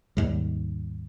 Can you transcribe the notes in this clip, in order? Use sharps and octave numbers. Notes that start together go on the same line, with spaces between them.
D#2 G#2 G3